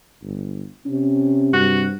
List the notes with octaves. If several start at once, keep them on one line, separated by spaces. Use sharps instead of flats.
G1
C3 C#4
G2 F#4